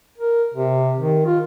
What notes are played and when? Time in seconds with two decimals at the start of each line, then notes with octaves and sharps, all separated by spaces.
0.18 A#4
0.54 C3
0.98 D#3
1.26 F4